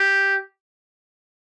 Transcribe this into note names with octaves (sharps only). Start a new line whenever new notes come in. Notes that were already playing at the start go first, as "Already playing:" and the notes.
Already playing: G4